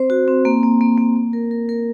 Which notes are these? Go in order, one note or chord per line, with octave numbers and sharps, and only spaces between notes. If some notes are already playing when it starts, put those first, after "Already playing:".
Already playing: C4 C5
F#4
C4
A#3
A#3
A#3
A#3
A#3
A#4
A#4
A#4